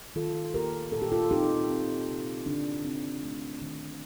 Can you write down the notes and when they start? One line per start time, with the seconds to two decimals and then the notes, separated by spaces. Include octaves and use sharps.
0.16 D#3 F4 A4
0.54 A#3 G4 A#4
0.92 A#2 A4
1.02 G4
1.12 F4 A4
1.31 C4 D#4 G4
1.69 C4
2.08 C3
2.46 D3 D4
2.85 C4
3.23 A3
3.62 D#3